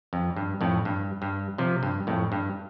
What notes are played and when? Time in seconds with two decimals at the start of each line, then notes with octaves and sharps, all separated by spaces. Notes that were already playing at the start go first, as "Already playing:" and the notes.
0.13 F2
0.36 G2
0.61 F2 A2
0.85 G2
1.22 G2
1.58 C3 F3
1.83 G2
2.07 F2 A2
2.32 G2